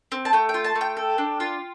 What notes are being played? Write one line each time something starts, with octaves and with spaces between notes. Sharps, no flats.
C4
A5
A3 G5
G5
F4
A5
A3
G5
A4
D4
F4